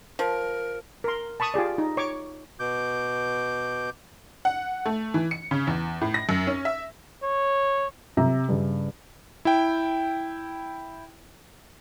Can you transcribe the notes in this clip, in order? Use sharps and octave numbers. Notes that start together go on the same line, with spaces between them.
F3 A#4
A#4 C6
A5 B5 C#6 D#6
F4 G4 G#4 D5
D#4
C#5 C#6 D6
B2 D6 G6
F#5
A3
E3
C#7
C#3
E2
A2
A#6
F#2
C#4
E5
C#5
C3 A#5
G2 C#3
E4 G5